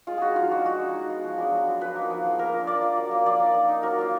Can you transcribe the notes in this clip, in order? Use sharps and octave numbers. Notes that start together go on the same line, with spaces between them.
G#3 F4
D#4 F#4 G#4
F3 F4
G#3 D4 F#4
G#3 F#4
D#4
G#3
B3 F4
F3
G#3 B3 D4
F#3
B3 F4
F3 B4
A#3 D#4
F3
G#3 B3 F4
A#3 A#4
D4 F4
A#3 D5
F4
F#3
A#3 F4
F3 D5
A#3 D#4
A#3
D#4
F#3 A#4
A#3 F4